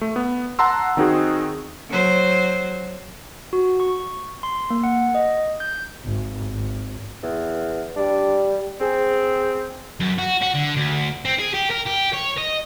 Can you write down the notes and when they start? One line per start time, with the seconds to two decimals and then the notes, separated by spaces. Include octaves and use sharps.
0.01 A3
0.16 B3
0.59 F#5 A5 A#5 C6 E6
0.97 D#3 C4 D#4 F#4 G#4
1.89 F#3 C5
3.53 F#4
3.80 C#6
4.43 C6
4.70 A#3
4.84 F#5
5.15 D#5
5.60 G6
6.05 G#1
6.52 G#1
7.23 E2
7.96 G3 D4
8.81 C4 G#4
10.00 F#2
10.18 F#4
10.42 F#4
10.54 D3
10.76 D2
11.25 C4
11.39 G#4
11.54 G4
11.71 A#4
11.87 G4
12.14 C#5
12.38 D#5